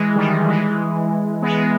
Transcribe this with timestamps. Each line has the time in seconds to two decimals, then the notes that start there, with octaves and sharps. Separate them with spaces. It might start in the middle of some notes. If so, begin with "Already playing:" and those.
Already playing: E3 G#3
0.15 D#3 G3
0.47 E3 G#3
1.42 G#3 B3